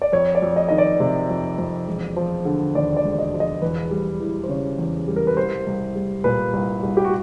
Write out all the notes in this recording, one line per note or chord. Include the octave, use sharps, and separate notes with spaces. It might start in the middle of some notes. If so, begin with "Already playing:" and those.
D5
F2 C#5
D5
F2
D#5
D#3 D#5
D5
C3
F2
F2
E1
F3
D3
D#2 D5
D5
E1
D#5
F3
D#5
E2 B4
G3
E3
C5
C#3 C#5
E2
G3
A#4
B4
C2 C5
C2
G3
A#2 B4
C2
C2
G4
F#4